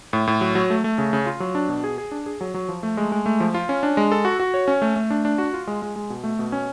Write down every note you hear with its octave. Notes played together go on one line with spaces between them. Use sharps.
A2
A2
F#3
F#3
A3
A3
C#3
C#3
F4
F#3
D4
B2
G#4
G#4
D4
G#4
F#3
F#3
F3
A3
G#3
G#3
A3
F3
F4
C#4
D4
G#3
A4
F#4
F#4
C#5
C#4
A3
A3
D4
D4
F#4
F4
G#3
G#3
G#3
B2
A3
B2
C#4